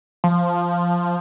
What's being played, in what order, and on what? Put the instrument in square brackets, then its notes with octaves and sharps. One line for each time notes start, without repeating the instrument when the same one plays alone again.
[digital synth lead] F3